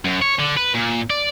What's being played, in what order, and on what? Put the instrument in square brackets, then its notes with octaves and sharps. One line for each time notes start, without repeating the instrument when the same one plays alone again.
[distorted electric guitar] F#2
C#5
D3
B4
A#2
D5